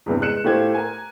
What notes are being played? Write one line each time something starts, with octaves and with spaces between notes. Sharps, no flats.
E2 G2 C3
G#3 F#6 C#7 E7
A2 A3 F4 G4 C5 G#6
A#4 G#5